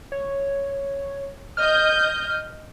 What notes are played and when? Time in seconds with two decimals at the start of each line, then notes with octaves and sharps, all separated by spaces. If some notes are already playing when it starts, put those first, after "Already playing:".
0.12 C#5
1.57 D#5 F6 G6